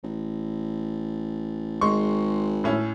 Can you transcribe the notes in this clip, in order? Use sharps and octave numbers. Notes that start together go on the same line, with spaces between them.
A1
G#1 G#3 C6 C#6
A2 C#4 E4